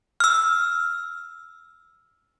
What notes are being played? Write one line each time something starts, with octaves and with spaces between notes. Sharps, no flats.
E6 F6